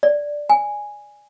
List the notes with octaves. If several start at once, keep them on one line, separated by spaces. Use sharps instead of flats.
D5
G#5